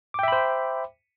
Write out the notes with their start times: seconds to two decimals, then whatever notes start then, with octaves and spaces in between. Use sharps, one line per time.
0.14 D6
0.19 G5
0.23 E5
0.28 B5
0.32 C5